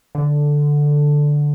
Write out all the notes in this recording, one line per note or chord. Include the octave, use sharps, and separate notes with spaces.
D3